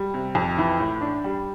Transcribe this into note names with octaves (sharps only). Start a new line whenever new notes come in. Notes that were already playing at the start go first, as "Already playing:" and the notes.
Already playing: G3
C3
F2
E3
A2
D4
G3